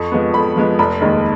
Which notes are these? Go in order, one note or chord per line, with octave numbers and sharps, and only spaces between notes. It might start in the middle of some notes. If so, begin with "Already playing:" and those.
Already playing: F2 C#6
F3 G#3 B3
F2 B5
F3 G#3 B3
F1 B5
D#2 D#3 G#3